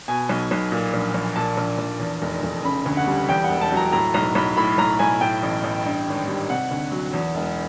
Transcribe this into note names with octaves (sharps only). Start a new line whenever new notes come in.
B2 G#5
B1
B1
A#2
A#1
A#1
A#2 A5
A#1
A#1
E2
F1
F1
C#3 B5
D2
F#5
G3
E2 G5
F#5
E1
A5
F#3 A#5
A2 A#5
B1 A#5
B1 B5
A2 B5
B1 A#5
B1 G#5
A2 G5
A1
A1
G2
G#1
G3
C3 F#5
D2
F#3
E2
E1